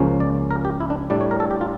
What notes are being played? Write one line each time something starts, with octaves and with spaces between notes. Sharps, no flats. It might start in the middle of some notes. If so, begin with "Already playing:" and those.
Already playing: C#2 C#3 F3 A#3 C#4
D5
A#4
G4
E4
D4
A2 G3 D4 D5
C#5
A#4
A4
G4
F4